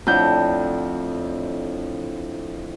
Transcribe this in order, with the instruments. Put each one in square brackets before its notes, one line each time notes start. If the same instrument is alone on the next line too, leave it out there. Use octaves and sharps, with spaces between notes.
[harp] F2 G6 [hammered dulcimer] A2 D3